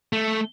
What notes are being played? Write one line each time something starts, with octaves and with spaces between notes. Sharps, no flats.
A3